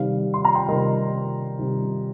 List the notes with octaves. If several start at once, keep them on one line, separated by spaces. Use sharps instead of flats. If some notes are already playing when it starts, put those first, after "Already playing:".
Already playing: C3 D#3 G3 F5
C6
A#5
G5 C6
C3 D#3 G3 A#4 D#5
C3 D#3 G3